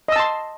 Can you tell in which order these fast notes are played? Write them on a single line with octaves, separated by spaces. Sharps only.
D#5 E6 A5 C6